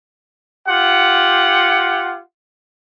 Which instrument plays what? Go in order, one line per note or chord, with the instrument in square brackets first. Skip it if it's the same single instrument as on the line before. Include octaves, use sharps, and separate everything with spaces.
[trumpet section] F4 G4 F#5